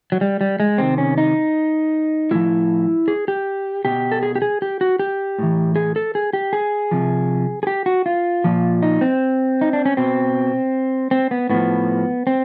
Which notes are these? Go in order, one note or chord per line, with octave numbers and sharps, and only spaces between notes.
F#3
G3
G3
G#3
C3 D#3 C4
C#4
D#4
A2 F3 E4
G#4
G4
B2 G4
A4
G#4
G4
G#4
G4
F#4
G4
A2 E3
G#4
A4
G#4
G4
G#4
C3 F3
G#4
G4
F#4
F4
A#2 F3
D#4
C4
D#4
D4
C#4
B2 C4
C4
B3
A2 F3 B3
C4